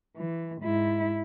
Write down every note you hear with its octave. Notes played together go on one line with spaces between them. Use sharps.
E3
G#2 E4